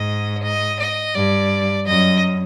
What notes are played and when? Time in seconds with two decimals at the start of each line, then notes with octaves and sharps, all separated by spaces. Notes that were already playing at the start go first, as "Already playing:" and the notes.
Already playing: G#2 D#5
0.43 D#5
0.79 D#5
1.15 G2 D5
1.87 F#2 D#5